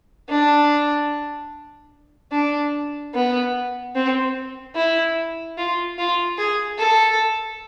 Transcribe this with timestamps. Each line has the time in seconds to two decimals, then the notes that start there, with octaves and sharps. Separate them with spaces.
0.30 D4
2.32 D4
3.14 B3
3.95 C4
4.76 E4
5.58 F4
5.98 F4
6.38 G#4
6.79 A4